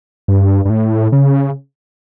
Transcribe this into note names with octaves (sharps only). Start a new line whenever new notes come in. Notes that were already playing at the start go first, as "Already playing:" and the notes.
G2
G2
A2
C#3